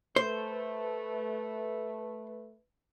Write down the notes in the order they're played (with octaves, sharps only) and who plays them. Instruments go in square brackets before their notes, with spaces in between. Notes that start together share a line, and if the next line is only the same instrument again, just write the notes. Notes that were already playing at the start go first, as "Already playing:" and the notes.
[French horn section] A3 B4 [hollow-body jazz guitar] C5